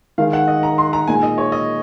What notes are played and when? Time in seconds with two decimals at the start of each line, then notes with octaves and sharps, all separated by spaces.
0.18 D#3 G#3 D#4 F5
0.33 F#5
0.48 D#5
0.63 A#5
0.78 C6
0.93 A#5
1.08 A#2 G#3 D#4 G#5
1.23 D#5
1.38 C#5
1.52 D#5